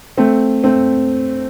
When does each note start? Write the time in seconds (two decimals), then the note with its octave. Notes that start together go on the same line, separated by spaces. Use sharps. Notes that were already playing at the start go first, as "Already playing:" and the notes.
0.18 A3 C4
0.64 A3 C4